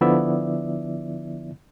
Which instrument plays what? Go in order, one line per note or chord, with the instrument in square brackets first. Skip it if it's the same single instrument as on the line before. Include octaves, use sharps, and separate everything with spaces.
[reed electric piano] D3 F3 B3 E4 D5 E5